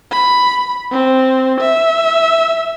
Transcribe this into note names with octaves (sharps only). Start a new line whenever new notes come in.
B5
C4
E5